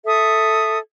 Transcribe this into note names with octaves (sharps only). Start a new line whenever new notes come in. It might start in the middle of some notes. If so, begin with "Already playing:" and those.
A4 E5 D#6